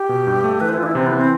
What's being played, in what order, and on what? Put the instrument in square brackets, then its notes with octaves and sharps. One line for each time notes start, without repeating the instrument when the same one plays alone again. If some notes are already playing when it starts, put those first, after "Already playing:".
Already playing: [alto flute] G4
[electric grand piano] B2
G2
A3
[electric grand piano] E3 [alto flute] B4
[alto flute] C5
E4
[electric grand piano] E3 [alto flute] F4
[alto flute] D4
E4
[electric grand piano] C3 [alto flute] C4
[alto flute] B3
[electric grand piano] E3
[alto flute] C4